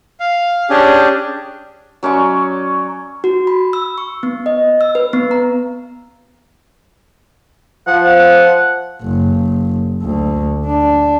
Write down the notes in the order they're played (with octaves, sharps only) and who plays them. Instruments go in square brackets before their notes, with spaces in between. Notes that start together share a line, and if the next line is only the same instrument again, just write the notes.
[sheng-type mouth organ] F5
C#4 D4 G4 G#4
[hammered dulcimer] F#3 C#4 D5 C#6
[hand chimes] F#4
B5
E6
C#6
B3
D#5
E6
B4
B3
A#5
[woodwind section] F3 [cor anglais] F#5
[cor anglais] F#5
[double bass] F#1
D2
D4